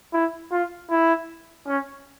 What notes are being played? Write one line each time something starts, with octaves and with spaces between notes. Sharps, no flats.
E4
F4
E4
C#4